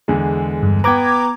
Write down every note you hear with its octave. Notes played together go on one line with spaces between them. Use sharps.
E2 D3 G#3
G2
B3 G5 A#5 D6 G#6